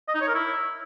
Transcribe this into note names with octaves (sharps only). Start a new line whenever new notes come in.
D#5
D#4
C#5
A#4
E4